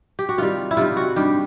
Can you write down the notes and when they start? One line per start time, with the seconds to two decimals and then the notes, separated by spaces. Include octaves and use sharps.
0.19 G4
0.29 F#4
0.38 C3 D#3 G3 F4
0.71 E4
0.77 C3 D#3 G3 F4
0.97 F#4
1.16 G2 D#3 G3 G4